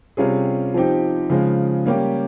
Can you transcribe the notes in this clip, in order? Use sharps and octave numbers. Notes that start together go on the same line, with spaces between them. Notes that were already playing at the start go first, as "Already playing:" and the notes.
C3 G3 C#4 F4 G#4
F3 C4 D#4 G4
C#3 F3 G#3
G3 A#3 C#4 G4